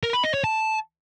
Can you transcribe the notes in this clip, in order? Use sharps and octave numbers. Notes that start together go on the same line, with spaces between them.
A#4
B5
D#5
C#5
A5